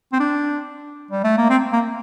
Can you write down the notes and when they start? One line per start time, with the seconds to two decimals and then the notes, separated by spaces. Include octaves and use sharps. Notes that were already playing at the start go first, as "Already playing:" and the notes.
0.13 C4
0.20 D4
1.11 G3
1.24 A3
1.38 A#3
1.50 C4
1.73 A#3